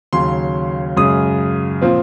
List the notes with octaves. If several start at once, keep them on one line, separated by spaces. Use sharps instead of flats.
D#2 C#3 F#3 C6
F#2 C#3 G#3 D#6
A#2 F3 C4